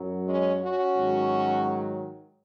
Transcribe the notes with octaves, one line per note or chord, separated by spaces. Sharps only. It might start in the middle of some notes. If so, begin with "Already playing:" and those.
Already playing: F#2 F#3
G#3 C#4
C#4 F#4
G#2 D#3 F#3